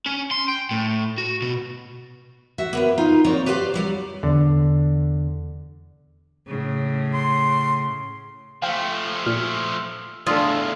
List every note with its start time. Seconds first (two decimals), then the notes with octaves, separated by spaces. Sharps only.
0.06 C#4
0.31 C6
0.48 G5
0.71 A2
1.18 F#4
1.42 B2
2.58 F#4 E5
2.73 A#3 B3 B4
2.98 D#4 F4 F5
3.24 F#3 A#3 C4 A#4 C#5 D5
3.46 G4 B4 C5 D5 F5
3.74 F#3 G3 D5
4.23 E2 D3
6.47 A2 C#3
7.14 C6
8.62 F3 A3 F5 G5
9.26 A#2 F6
10.27 E2 A2 D4 F4 A4 D#6